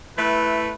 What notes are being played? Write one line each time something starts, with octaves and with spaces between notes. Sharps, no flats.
A3 E4 B4